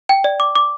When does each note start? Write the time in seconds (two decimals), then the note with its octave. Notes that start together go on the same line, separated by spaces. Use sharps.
0.09 G5
0.24 D5
0.40 D6
0.56 D6